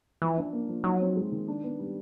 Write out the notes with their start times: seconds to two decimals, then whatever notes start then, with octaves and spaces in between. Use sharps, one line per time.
0.22 E3 F3
0.37 D4
0.53 A#3
0.68 F3
0.84 F#3 D#4
1.00 C4
1.16 G#3
1.32 D#3
1.48 D4
1.63 B3
1.79 G3